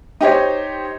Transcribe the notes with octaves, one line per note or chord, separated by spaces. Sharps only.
D#4 G4 C5 C#5